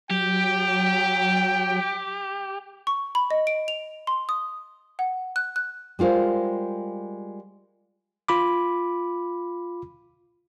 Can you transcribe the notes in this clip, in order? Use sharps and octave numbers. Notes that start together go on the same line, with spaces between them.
F#3 G4 G5
C#6
B5
D#5
D7
F7
C6
D#6
F#5
F#6
F#6
G3 G#3 F4 A#4 C5
F4 B5 D6